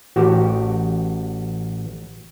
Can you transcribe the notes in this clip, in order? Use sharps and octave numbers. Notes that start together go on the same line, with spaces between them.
A1 F#4 G4